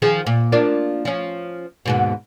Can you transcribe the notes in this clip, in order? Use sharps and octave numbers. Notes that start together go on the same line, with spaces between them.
D#3 F3 G#4
A#2
F3 A#3 D4
F3 C#4
D#2 G#2 B2